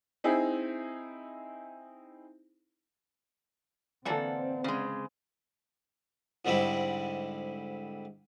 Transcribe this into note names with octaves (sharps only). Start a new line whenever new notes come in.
C4 D#4 E4 G#4
D3 E3 A#3 C4 A4 D5 F#5
C#3 G#3
G#2 D3 G3 C4 E4